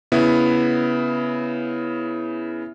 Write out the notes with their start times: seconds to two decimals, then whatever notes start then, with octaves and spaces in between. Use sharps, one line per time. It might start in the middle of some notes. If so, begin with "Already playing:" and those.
0.12 C#3 B3 E4